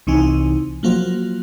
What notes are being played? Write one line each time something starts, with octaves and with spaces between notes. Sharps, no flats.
C2 C3 E3 D#4 G#5
F3 F#3 A#3 F4 F#4 C5